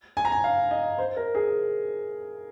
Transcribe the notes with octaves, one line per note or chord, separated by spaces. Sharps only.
G#5
A#5
G#5
F5
D#5
C5
A#4
G#4